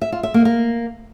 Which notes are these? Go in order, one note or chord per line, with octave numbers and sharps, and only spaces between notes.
E5
F4
E5
A#3
A#3